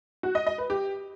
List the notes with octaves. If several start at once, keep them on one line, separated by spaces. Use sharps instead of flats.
F#4
D#5
D#5
B4
G4